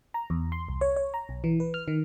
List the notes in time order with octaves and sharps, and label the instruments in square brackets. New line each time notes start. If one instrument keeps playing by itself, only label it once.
[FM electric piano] A#5
E2
C6
C2
C#5
C#5
A#5
B1
E3
B4
F6
D#3